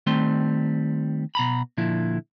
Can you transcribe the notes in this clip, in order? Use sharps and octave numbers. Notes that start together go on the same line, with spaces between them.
D#3 G3 A3 C4 C6
B2 A#5 B5
A#2 D3 F3 E4